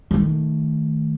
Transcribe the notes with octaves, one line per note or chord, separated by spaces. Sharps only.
D#3 A3